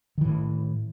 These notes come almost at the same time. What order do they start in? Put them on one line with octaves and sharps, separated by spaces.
D#3 E3 A2